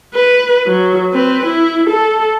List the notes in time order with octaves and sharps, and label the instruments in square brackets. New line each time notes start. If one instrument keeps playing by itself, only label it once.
[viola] B4
F#3
C4 B4
E4
A4